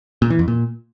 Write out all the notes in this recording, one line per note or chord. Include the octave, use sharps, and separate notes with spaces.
A#2
E3
F2
A#2